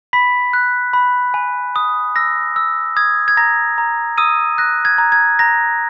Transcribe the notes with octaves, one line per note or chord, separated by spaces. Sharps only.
B5 B6
F#6
B5
G#5
D#6
E6 A#6
E6
D#6 G#6
G#6
A#5 A#6
A#5
D#6 E6 D#7
F#6 A#6
G#6
A#5
G#6
A#5 A#6